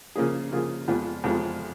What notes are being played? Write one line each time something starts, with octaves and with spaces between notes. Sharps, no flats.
C#3 F3 A#3 F4 G#4
C#3 F3 A#3 F4 G#4
F2 F3 G#3 B3 F4
F2 F3 G#3 B3 F4